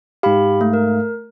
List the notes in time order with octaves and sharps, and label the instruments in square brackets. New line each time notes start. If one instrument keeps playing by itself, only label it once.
[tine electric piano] G#2 F5 [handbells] G4 B5
[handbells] A3
A#4